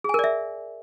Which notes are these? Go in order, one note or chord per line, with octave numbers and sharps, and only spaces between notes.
G#4 A#4 D5 E5 G#5